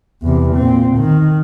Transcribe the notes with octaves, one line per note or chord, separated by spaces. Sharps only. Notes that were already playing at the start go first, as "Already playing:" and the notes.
E2 C3
A#2 C4
D#3